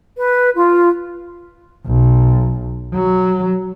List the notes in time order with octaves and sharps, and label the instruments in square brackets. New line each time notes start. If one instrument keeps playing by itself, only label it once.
[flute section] B4
F4
[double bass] B1
F#3